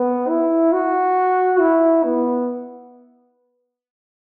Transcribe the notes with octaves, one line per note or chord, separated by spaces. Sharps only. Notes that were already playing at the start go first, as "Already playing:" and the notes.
Already playing: B3
E4
F#4
E4
B3